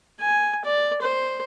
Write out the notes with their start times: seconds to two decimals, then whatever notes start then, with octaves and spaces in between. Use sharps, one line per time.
0.21 G#5
0.65 D5
1.02 C5